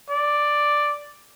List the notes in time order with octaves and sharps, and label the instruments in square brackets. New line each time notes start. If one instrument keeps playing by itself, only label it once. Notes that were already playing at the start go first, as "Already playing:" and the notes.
[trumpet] D5